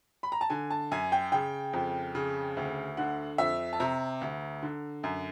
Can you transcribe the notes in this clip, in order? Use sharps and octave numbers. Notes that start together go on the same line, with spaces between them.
B5
A#5
A5
D3 G#5
A5
F#2 G#5
G5
C#3 G5
F2
C#3
D2
D3 F#5
F2 E5
A5
C3 A#5
D2
D3
F#2